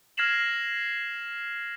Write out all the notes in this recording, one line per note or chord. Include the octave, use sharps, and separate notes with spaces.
F6 G#6 A#6 C7 E7 F#7